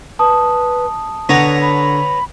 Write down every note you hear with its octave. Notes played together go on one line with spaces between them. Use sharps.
B4 A5 D#6
D3 B3 C#5 F#5 A#5
B5